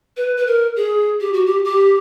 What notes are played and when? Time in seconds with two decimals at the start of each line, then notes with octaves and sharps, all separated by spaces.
0.17 B4
0.37 B4
0.47 A#4
0.76 G#4
1.21 G4
1.33 F#4
1.46 G4
1.65 G4